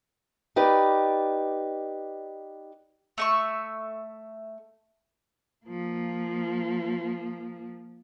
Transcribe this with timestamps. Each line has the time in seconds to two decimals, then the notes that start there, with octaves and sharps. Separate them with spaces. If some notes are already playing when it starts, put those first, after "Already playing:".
0.56 D#4 G4 B4 D5
3.18 A3 E5 C#6
5.66 F3 A#3